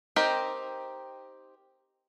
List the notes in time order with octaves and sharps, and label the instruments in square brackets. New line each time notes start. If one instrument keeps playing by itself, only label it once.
[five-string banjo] C4 D#4 G4 A#4